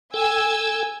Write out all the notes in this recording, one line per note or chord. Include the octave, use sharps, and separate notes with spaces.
A4 G5 G#5 E6